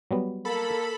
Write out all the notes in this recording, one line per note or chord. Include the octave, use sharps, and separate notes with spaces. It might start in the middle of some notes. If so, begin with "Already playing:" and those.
F#3 G3 B3
A#3 A4 B5